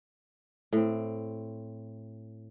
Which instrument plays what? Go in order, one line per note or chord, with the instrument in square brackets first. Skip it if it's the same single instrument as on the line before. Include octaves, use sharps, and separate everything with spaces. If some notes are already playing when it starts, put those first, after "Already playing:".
[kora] A2 C4